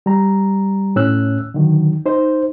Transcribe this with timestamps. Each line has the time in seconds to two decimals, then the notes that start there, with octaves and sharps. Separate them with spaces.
0.06 G3 A#5
0.96 A2 C#4 E6 F#6
1.54 D3 D#3 F#3
2.06 D#4 C5